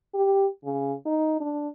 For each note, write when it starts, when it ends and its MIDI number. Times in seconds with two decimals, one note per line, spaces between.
0.14 0.47 67
0.65 0.93 49
1.06 1.37 63
1.41 1.69 62